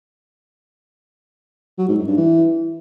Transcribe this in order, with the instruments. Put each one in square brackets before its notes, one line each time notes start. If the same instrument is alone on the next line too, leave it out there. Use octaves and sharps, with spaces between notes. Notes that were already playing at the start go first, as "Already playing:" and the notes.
[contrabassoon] F#3
G#2
F#2
G2
E3